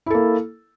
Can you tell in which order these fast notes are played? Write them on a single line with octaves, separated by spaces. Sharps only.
E4 A4 A#3